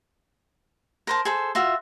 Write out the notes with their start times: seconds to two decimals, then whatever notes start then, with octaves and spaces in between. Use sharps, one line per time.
1.07 A#4 C5 A5
1.25 G#4 A4 C5
1.55 F4 F#4 E5